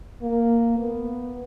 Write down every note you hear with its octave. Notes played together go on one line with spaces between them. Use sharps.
A#3
B3